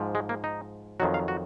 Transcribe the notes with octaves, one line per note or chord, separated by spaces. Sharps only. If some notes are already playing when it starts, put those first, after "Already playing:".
Already playing: G#2 F3
G#3
A#3
D#4
F2 D#3 F#3 F#4
F5
F#4